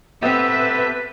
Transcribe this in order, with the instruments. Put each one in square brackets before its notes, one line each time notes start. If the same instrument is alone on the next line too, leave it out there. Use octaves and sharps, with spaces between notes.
[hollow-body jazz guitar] B3 C4 [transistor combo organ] G4 A4 [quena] B4 [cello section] E5